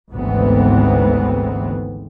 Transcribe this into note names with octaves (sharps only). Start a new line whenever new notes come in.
G#1 D2 G#2 E3 B3 C4